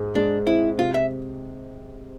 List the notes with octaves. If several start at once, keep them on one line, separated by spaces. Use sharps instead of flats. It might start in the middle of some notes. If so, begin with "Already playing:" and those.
Already playing: G#2 G#4
G#3 D4
C4 E4
C3 F4
E5